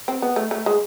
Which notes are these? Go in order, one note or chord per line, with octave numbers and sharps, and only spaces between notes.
C4
B3
A3
A3
G#3